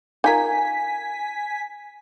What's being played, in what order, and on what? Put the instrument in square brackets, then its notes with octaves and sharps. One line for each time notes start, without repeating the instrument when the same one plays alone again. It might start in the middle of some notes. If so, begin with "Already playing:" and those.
[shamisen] D#4 F4 A#4 [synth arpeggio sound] G#5 B6